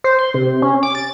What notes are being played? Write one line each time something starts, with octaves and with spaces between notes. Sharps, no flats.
C5
C6
C3
C#4
D6
A6